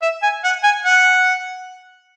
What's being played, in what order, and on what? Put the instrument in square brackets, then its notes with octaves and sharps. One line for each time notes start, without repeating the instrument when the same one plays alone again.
[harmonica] E5
G#5
F#5
G#5
F#5